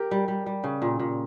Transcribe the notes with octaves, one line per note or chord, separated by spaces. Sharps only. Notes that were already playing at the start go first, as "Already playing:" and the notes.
Already playing: G4 A#4
G3
G3
G3
C#3
A#2
A#2